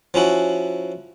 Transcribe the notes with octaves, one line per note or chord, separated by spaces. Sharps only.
F3 C#4 E4 F#4